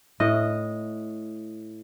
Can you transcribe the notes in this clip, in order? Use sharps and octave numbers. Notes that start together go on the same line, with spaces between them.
A2 D#5